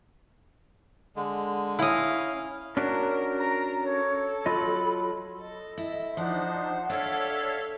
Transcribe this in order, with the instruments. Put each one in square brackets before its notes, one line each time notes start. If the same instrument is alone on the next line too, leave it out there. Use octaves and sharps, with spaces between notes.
[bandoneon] D3 G#3
[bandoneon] C#4 F5 [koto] E4 D#5
[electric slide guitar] C#4 D4 F#4 [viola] A#4
[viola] A#4 A#5
[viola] A4 [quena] C#5
[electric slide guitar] F#3 F4 D#5 [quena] B5
[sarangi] A4 [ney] D#5
[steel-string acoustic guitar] E4
[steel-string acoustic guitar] F3 [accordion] D4 D#4 [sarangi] C5 [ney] F#5
[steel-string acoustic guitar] D4 [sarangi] A4 [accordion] C#5 E5 F5